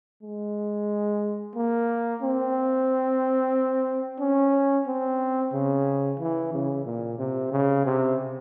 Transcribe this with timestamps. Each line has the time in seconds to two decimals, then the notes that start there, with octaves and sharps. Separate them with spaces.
0.23 G#3
1.56 A#3
2.22 C4
4.20 C#4
4.87 C4
5.53 C#3
6.19 E3
6.53 C#3
6.86 A#2
7.19 C3
7.52 C#3
7.85 C3